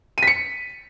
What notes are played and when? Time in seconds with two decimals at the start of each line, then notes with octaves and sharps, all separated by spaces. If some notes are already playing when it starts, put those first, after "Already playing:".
0.18 D#7
0.23 B6
0.27 C#7